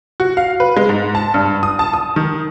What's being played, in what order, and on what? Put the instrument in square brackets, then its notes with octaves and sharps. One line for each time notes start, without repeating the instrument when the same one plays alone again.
[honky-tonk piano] F#4
F5
B4
G#3
G#2
A5
G2
D#6
A5
D#6
D#3